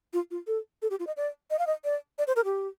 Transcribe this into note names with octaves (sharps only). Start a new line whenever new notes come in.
F4
F4
A4
A4
G4
F4
D#5
D5
D#5
F5
D#5
D5
D5
C5
A#4
G4